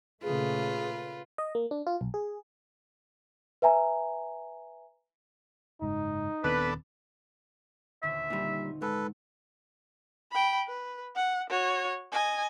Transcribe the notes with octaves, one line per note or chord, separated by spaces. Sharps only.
A#2 C#3 A3 F4 G#4 B4
D#5
A#3
D4
F4
B1
G#4
B4 E5 G#5 A#5
F#1 G#2 D#4
D#1 D#3 B3 C4 D4 A4 B4
D#1 D2 E5
A#2 G3 C4 D#4
G#2 A4 B4
G5 B5
B4
F#5
F#4 C#5
D#5 G#5